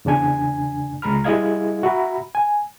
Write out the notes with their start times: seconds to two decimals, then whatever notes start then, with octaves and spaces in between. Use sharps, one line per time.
0.05 E2 C#3 D4 G#5 G#6
1.02 C#2 G#3 A#5 B5 F6
1.24 G3 E4 G#4 D#5 F5 G#6
1.83 F#4 E5 A#5 B5
2.35 G#5